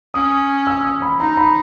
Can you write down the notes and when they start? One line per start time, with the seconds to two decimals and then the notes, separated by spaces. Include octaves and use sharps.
0.14 C#4 D#6
0.67 E6
0.84 D#6
1.02 B5
1.20 D#4 A#5
1.37 B5